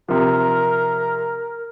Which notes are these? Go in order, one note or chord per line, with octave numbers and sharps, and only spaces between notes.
C3 F3 A#4